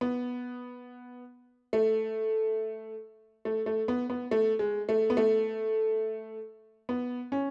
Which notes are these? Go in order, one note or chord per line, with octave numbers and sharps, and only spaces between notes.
B3
A3
A3
A3
B3
B3
A3
G#3
A3
B3
A3
B3
C#4